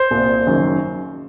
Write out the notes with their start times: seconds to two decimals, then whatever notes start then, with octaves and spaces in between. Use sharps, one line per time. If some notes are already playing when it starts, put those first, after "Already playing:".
Already playing: C5
0.11 C2 A#2
0.47 F#1 F#2 D#3